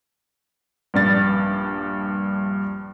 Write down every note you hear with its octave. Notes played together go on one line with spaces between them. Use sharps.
A#1 G2 A6